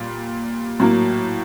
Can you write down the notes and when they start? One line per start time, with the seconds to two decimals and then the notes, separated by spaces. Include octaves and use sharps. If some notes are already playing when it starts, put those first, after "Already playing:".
Already playing: A#2 G3
0.80 A2 F#3 A#3